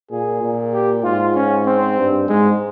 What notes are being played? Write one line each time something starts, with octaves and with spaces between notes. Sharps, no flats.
A#2 G#4
A#2
G4
G#2 F4
C#4
C4
G2
G#2 G#3